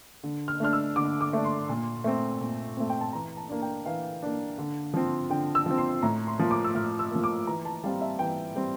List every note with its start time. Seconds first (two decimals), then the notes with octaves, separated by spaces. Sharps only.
0.24 D3
0.48 F6
0.60 A3 D4 F6
0.73 E6
0.96 D3 D6
1.21 D6
1.33 A3 D4
1.44 C6
1.69 A#2
2.04 A3 C4
2.41 A#2
2.77 A3 C4
2.90 G5
3.01 A5
3.13 E3 A#5
3.37 A5
3.49 A#3 D4
3.62 G5
3.86 E3 F5
4.22 A#3 D4
4.59 D3
4.94 F3 C4
5.30 D3 G5
5.55 E6
5.66 F3 C4
5.78 C6
6.03 A2 A#5
6.27 C6
6.39 F3 A#3
6.51 D6
6.64 E6
6.75 A2 F6
6.99 E6
7.11 F3 A#3
7.24 D6
7.47 E3 A#5
7.65 A5
7.84 G3 C4 F5
8.01 E5
8.19 E3 G5
8.56 G3 C4